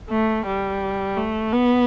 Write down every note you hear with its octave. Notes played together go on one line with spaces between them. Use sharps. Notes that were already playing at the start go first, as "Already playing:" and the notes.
A3
G3
A3
B3